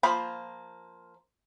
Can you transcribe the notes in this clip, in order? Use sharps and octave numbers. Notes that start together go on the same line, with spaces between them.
F3 A#3 C5 B5